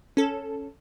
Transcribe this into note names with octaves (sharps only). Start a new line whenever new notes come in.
C#4 A4